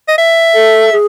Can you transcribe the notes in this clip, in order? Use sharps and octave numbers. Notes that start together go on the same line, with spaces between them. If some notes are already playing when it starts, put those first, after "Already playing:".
D#5
E5
A4
G#4